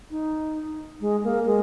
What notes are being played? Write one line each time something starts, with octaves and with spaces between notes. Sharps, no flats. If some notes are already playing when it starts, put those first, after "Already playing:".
D#4
G#3
A#3
G#3